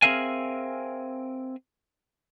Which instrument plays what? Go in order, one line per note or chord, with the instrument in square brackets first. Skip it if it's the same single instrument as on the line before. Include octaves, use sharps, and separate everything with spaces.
[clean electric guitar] C4 G#4 A#4 E5 F5 G#5